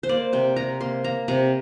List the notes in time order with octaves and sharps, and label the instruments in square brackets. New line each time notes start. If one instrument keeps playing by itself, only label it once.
[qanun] C5
A#3 D5
C3 G5
C3 A#5
A#3 C6
A#3 A#5
C3 A#5